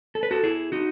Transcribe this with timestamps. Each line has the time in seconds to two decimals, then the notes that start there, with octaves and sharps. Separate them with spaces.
0.15 A4
0.23 B4
0.31 F#4 A4
0.44 E4 G#4
0.72 D#4 F#4